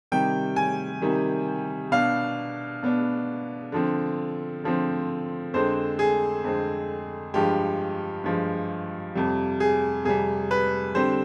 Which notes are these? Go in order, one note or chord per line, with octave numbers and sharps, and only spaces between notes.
C3 D#3 G3 G5
G#5
C3 D#3 G3
B2 B3 D4 F5
B2 B3 D4
D3 F3 C4
D3 F3 C4
F2 D3 G#3 C4 C5
G#4
F2 D3 G#3 C4
G2 F3 G#3 G4
G2 F3 G#3
F2 C3 G3
G#4
F2 C3 G3 G#4
B4
D3 G3 C4 C5